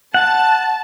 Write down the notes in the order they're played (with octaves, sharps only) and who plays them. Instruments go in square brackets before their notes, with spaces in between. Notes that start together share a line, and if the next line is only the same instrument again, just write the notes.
[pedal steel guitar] F#5 [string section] A5